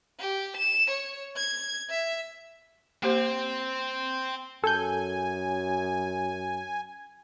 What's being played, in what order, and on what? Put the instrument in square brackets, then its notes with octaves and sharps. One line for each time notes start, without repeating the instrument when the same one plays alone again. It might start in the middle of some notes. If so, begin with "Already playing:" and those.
[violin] G4
E7
C#5
G#6
E5
[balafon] A#3 G4 C5 [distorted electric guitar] C4
[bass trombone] F#2 [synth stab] A4 G6 [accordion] G#5